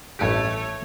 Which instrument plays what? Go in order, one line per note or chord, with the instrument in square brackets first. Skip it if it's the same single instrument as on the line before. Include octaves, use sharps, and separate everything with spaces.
[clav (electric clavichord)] A1 G2 G4 [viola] A3 C#5